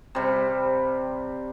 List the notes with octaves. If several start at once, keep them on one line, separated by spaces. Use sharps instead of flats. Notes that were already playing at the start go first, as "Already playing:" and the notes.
C3 G3